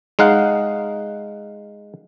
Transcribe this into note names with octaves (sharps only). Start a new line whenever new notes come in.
G#3 D#4 F5 F#5